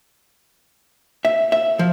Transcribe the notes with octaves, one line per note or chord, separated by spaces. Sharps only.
E5
E5
F3